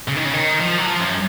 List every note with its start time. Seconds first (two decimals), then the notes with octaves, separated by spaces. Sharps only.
0.09 C#3
0.16 D#3
0.25 C#3
0.34 D#3
0.60 F3
0.78 F#3
0.86 F3
1.00 F#2